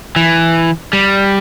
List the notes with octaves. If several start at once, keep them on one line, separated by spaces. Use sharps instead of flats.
E3
G3